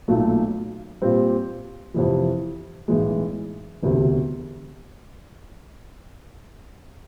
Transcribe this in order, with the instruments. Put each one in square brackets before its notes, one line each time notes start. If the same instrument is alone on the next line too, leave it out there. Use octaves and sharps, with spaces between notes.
[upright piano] B1 A#2 F#3 A3
A#2 G3 C4
F2 C3 E3
B1 A2 E3 G#3
E1 D2 C3